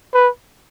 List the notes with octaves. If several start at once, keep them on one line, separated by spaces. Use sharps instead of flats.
B4